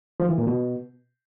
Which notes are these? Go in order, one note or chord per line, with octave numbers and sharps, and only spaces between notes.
F3
E3
A#2
B2